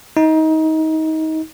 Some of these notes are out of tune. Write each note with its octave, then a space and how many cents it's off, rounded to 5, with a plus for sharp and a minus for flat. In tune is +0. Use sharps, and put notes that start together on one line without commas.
D#4 +25